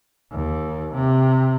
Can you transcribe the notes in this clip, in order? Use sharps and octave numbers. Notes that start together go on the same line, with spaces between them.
D#2
C3